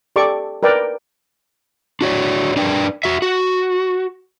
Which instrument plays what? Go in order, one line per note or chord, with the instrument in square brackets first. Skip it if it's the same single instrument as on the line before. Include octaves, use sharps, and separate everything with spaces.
[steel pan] G4 A4 D5 C#6 D6
A#4 B4 D5 G5
[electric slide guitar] D4 F#4 C#5 D5
D4 A#4 B4 D5 G5
F#4 E5
F#4